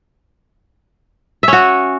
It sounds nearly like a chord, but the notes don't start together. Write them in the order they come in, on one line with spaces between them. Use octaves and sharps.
E5 C#4 F#4